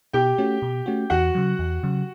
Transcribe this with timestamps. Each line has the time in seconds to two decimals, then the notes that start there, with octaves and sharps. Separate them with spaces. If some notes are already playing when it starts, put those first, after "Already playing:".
0.13 B2 G4 G5
0.38 A3 C#4 F#4
0.62 B2
0.86 A3 C#4 F#4
1.10 E2 F#4 F#5
1.35 C#3 F#3
1.59 E2
1.83 C#3 F#3